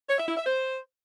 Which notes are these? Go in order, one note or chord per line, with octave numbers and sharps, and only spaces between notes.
C#5
E5
E4
E5
C5